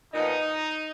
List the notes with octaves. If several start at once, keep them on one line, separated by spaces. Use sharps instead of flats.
A#2 F3 B3 D#4